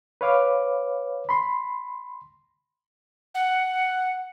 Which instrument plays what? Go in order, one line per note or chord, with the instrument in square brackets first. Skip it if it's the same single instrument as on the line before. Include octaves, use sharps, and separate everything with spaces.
[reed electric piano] B4 C#5 F5 D6
B5 C6
[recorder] F#5